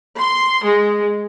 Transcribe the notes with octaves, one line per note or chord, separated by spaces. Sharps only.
C6
G#3